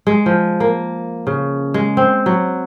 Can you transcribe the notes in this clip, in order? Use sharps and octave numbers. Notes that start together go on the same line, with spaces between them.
G#3
F3
A#3
C#3
G#3
C4
F#3